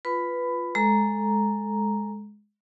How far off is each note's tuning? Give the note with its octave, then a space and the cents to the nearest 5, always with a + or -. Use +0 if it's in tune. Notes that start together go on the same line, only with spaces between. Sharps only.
F4 +0 B4 +0 B5 +15
G#3 +5 A4 +0 A#5 +0